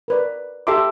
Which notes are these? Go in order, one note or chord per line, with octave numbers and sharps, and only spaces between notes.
A#4 B4 D5
G4 A4 E5 A#5 C6 D6